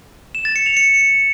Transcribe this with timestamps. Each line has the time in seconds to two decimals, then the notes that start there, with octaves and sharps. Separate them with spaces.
0.35 E7
0.45 A6
0.56 C#7
0.66 F7
0.77 C#7